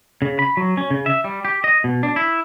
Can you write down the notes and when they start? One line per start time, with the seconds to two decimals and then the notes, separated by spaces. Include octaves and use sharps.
0.22 C#3
0.39 B5
0.57 F#3
0.77 C#4
0.90 C#3
1.06 E5
1.24 G3
1.45 G4
1.64 D#5
1.84 B2
2.03 D4
2.16 E4